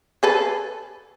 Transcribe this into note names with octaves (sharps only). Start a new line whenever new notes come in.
G#4 A4 B4